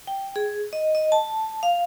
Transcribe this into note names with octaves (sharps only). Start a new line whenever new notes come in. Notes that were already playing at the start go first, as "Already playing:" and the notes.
G5
G#4
D#5
D#5
A5
F5